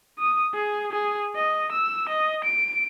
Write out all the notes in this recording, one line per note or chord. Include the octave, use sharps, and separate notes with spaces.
D#6
G#4
G#4
D#5
E6
D#5
D7